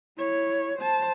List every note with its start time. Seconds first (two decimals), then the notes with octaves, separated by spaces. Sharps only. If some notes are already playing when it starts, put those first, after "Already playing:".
0.18 E4 C#5
0.78 C5 A5